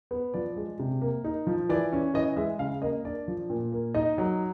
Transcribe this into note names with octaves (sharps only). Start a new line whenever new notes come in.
B3
F3 D5
G#3
C3
A#3
D#4
F3
E3 D5
C#4
E3 D#5
G#3 E5
C#3 F5
A#3 D#5
D4 D5
F3
A#2
A#3
D#4 D#5
F#3